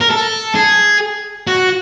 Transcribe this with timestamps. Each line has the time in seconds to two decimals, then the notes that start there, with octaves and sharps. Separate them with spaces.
0.01 A#4
0.10 A4
0.55 G#4
1.47 F#4